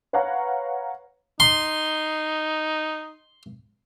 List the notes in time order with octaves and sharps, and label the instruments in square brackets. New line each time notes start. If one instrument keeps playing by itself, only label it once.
[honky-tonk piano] B4 C#5 F5 F#5 A#5
[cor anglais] D#4 [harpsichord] C6